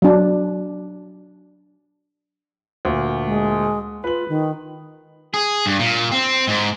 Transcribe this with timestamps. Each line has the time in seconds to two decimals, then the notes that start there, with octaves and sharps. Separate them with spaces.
0.02 F#3 D4
2.85 D2 A#2
3.26 G#3
4.04 F4 B4 F#7
4.29 D#3
5.34 G#4
5.66 G2
5.79 A#2
6.11 C4
6.47 G#2